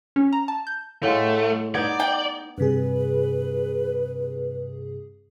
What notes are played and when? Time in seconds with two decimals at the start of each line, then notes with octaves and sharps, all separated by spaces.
0.16 C#4
0.33 A#5
0.48 A5
0.67 G6
1.03 A2 G#3 A3 F5 F#5 E6
1.74 B3 D#4 D5 G6 G#6
2.00 G5
2.58 G2 C3 G#4 B4